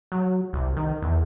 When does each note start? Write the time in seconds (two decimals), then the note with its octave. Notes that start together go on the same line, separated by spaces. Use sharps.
0.12 F#3
0.53 C2
0.77 D#3
1.02 E2